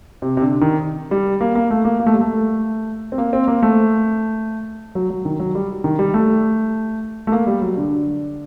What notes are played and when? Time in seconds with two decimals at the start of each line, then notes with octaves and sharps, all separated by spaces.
0.22 C3
0.37 C3
0.42 D3
0.61 D#3
1.11 G3
1.41 A#3
1.55 A#3
1.70 A3
1.85 A#3
2.00 A#3
2.06 A3
2.14 G3
2.21 A3
3.12 C4
3.18 A#3
3.33 C4
3.48 A#3
3.62 A3
4.95 F#3
5.10 F#3
5.25 D#3
5.40 F#3
5.55 G3
5.84 D#3
5.99 G3
6.14 A3
7.27 A3
7.32 A#3
7.47 G3
7.62 F#3
7.77 D3